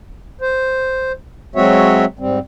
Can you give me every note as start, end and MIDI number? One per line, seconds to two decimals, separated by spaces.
0.41 1.12 72
1.56 2.05 54
1.56 2.05 56
1.56 2.05 60
1.56 2.05 66
1.56 2.05 73
1.56 2.05 76
2.19 2.39 44
2.19 2.39 55
2.19 2.39 60